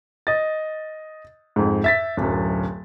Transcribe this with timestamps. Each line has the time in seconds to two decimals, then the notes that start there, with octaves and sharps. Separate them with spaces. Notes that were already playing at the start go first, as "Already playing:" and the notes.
0.27 D#5 A6
1.56 F2 G#2
1.84 E5 A6 B6
2.17 D1 F#2